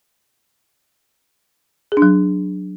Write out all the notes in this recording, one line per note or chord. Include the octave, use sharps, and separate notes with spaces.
G#4
D4
F#3